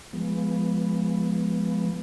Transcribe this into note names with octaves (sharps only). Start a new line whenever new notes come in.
F3 G#3 B3